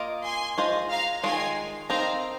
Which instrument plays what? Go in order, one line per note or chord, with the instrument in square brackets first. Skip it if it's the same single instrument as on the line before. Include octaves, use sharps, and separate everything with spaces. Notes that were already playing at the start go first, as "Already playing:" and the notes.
Already playing: [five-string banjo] A#3 F4 A#4 D#5
[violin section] G#5 C6
[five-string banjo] G#3 F4 C5 D#5
[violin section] F5 A#5
[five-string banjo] D#3 G#3 F4 A#4 [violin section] G#5 C6
[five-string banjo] C4 D#4 A#4 D#5 [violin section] F5 A#5